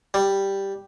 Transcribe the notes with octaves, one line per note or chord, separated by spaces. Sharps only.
G3